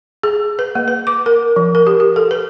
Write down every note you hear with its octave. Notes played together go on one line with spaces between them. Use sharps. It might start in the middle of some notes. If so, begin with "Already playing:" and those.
G#4
B4
A#3
B4
D6
A#4
F3
A#4
G4
G4
A4
B4